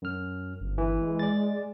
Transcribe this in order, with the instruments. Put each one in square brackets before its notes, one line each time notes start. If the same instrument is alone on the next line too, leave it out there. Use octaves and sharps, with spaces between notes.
[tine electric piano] F#2 F6
[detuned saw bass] G1
[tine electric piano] E3
[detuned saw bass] G#3
[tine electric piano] D5 A6